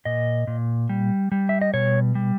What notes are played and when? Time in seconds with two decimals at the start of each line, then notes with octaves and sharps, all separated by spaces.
0.05 A#2 D#5
0.47 A#2
0.89 G3
1.32 G3
1.49 E5
1.61 D#5
1.74 B2 C#5
2.15 G3